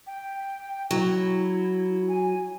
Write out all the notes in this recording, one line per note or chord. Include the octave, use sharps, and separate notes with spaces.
G5
F#3 E4
G#5